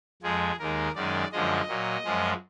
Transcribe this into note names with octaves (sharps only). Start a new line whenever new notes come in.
F2 F3 G#3 G#4
D#2 D#3 G#3 A#4
F#2 D#3 G#3 D5
F#2 D3 F3 G#3 D#5
A#2 F#3
F#2 F3 G#3